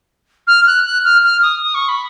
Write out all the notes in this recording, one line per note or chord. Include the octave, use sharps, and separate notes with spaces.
F6
F#6
F#6
F6
F6
D#6
D#6
C#6
B5